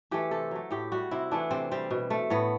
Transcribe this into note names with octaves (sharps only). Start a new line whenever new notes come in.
E3 A3 G4
C3 A4
F#3 A3
A2 G4
G3 F#4
C3 E4
E3 A3 D4
C3 C4
G3 C4
B2
A3
A2 B3